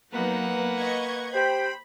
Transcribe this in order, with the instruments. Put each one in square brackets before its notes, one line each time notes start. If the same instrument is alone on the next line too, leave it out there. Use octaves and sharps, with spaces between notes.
[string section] F#3 B3 D#4 [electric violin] A#3 F#5 [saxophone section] B4
[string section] D#5 C#6 G#6
[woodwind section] G4 C5 G5 [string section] B5